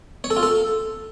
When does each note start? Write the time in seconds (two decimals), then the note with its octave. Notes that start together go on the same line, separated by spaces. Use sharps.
0.24 C#5
0.30 A4
0.37 F4
0.43 A4